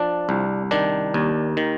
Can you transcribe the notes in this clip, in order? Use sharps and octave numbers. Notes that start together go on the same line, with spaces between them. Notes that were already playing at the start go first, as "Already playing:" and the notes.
Already playing: F3 D4
C2
D#3 D4
D#2
D#3